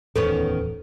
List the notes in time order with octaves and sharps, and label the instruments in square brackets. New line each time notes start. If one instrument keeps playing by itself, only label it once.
[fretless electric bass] D1 E2 [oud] D#3 B3 C#4 [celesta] A4